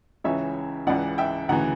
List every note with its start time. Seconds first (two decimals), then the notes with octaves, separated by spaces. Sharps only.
0.24 C#2 C#3 E3 C#5 E5
0.87 C#2 C#3 E3 D5 F#5
1.18 E5 G5
1.49 D2 C#3 E3 F#5 A#5